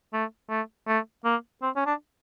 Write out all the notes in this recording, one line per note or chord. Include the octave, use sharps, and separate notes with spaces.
A3
A3
A3
A#3
C4
C#4
D4